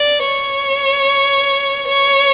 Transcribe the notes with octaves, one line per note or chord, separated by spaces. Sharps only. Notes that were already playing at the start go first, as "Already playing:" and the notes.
Already playing: D5
C#5
C#5